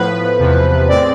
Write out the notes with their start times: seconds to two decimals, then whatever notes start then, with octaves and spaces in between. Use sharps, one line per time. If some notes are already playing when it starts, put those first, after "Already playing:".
Already playing: A2 F3 B3 B4
0.39 E2 C3 F3
0.88 A2 G#3 C4 D5